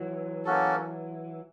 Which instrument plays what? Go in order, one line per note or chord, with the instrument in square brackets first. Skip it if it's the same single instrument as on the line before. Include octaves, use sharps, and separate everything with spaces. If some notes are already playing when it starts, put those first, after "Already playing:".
Already playing: [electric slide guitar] E3 F#3
[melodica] A#3 C#4 F#4 A4